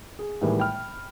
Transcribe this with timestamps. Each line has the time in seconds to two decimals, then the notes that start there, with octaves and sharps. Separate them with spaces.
0.19 G#4
0.41 A2 D#3 E3 G3 G#3 A#3
0.60 G5 B5 F6